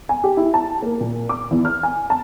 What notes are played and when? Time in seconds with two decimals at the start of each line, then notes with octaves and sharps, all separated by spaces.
0.09 G#5
0.24 G4
0.37 E4
0.54 A5
0.82 A#3
1.01 A#2
1.29 D6
1.51 E2
1.65 F6
1.83 G#5
2.10 A5